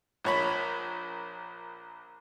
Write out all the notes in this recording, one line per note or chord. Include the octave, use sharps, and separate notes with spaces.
A#1 C#5 B5